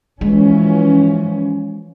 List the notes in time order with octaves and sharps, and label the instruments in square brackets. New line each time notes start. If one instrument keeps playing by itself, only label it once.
[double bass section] E3 F3 C#4 [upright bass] G#3